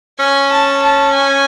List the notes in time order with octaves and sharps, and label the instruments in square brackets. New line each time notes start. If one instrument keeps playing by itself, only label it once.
[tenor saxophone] C#4 [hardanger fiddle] G#5
[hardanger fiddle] A5
A5
G#5